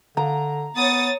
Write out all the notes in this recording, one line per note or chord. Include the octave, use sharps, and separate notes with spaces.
D3 A#5
B3 C#5 D#6 A6